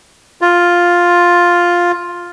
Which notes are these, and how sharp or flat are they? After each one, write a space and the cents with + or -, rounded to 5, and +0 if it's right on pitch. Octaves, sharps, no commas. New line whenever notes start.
F4 +5